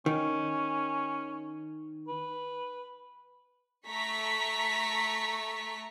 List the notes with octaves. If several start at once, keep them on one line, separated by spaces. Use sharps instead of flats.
D#3 C#4
B4
A3 A#5 C#6 B6